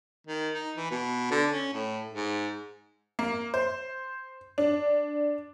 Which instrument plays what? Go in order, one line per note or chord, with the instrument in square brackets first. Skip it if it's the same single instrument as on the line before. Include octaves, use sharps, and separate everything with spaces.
[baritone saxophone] D#3
D#4
E3
B2
D3
C#4
A2
G#2
[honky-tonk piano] A#3
C5
D4